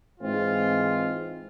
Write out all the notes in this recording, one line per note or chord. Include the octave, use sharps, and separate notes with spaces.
G#2 E3 G#3 C4 F4